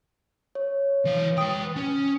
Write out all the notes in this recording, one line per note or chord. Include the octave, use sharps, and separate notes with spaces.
C#5
E3 F5
B4 G5 D#6
C#4